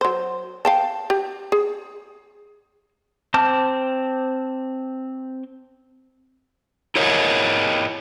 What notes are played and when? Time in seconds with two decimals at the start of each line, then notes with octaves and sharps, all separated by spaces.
0.01 F#3 C5
0.65 F5 G5 A5
1.10 G4
1.52 G#4
3.34 C4 C5 A5 D6 F6
6.96 E4 A#4 C#5 D#5 F#5